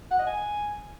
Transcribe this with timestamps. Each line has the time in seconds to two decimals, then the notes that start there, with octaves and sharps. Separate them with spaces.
0.11 F#5
0.19 D#5
0.27 G#5